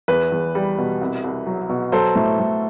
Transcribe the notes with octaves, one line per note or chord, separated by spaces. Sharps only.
E2 B4
E2
G3
B2
C2
C2
F#3
B2
F#3 A4 C5
A2
A2